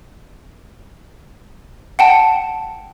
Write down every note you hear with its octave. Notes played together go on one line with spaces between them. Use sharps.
F#5 G5 A5